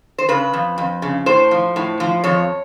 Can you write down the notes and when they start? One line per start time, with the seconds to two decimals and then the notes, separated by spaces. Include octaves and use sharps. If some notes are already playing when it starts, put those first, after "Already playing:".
0.18 C5
0.29 C#3 B4
0.53 F2
0.78 F2
1.02 C#3
1.26 A2 C5
1.51 F3
1.76 A2
2.00 F3
2.24 F2 C#5